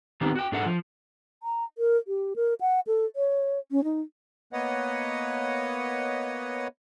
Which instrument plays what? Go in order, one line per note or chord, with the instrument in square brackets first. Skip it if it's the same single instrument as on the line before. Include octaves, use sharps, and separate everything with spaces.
[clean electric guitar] D#3 B3 C4 D#4 G4
F#4 G5
G#2 D4 G#4 A4 E5 F#5
F3
[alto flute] A#5
A#4
G4
A#4
F#5
A4
C#5
C#4
D#4
[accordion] A#3 B3 B4 C#5 D#5 F#5